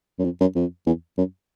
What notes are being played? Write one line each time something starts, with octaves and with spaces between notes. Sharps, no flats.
F#2
F2
F#2
F2
E2
F#2